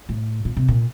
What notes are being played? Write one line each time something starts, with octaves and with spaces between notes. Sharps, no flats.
A2
A#2
C3
A#2